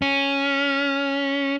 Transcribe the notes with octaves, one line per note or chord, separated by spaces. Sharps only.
C#4